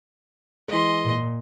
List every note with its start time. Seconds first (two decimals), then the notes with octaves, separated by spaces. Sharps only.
0.68 E3 G#3 D#5 C6
1.04 A#2